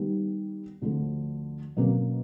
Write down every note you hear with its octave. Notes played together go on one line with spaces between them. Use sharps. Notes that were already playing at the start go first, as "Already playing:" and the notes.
Already playing: D#3 G3 B3
D2 D3 F3
B2 F#3 A#3 C#4